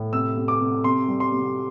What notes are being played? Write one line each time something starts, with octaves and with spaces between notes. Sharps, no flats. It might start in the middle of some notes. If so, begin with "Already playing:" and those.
Already playing: A2
C3 E6
C3
D6
C3
C3 C6
G3
C6
C3